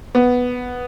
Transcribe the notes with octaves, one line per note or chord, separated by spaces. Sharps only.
B3